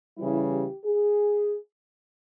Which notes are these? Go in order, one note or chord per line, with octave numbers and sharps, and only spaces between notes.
C#3 E3 G3 E4
G4
G#4